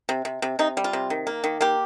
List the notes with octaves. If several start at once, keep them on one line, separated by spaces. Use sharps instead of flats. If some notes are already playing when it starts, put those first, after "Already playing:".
C3
C3
C3
C3 D#4
G3
F4
C3
D#3
A#3
D#3
A#3 G4